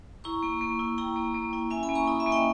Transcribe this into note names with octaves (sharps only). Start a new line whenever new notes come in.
E4 A#5 C#6
A#3
A#3
E4
E4 G5 A#5
A#3
A#3
E4
C#4 E5 G#5
G#5 B5
A#3
A#5 C#6
E4 B5 D#6
E5 G#5
A#3
D#5 G5